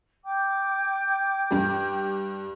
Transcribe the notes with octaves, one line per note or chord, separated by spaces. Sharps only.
G5 D6 G6
G2 G3